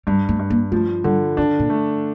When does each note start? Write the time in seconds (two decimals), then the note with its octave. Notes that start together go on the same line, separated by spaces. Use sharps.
0.07 G2 G3
0.29 A3
0.39 G2
0.50 A#3
0.72 F3 A3
1.04 D3 G3
1.37 D#3 D4
1.59 A#2
1.70 A3